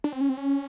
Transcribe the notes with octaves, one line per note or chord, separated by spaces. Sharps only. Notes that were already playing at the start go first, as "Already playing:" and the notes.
D4
C4
C#4
C4
C#4